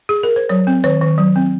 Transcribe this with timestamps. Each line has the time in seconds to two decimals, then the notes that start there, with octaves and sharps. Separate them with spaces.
0.09 G#4
0.23 A#4
0.36 C5
0.49 F#3 C#5
0.67 C4
0.84 D#3 C#5
1.01 D#3
1.18 F#3
1.36 C4